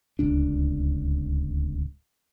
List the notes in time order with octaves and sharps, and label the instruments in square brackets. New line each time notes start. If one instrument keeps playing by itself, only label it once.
[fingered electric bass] D1 C#2 D4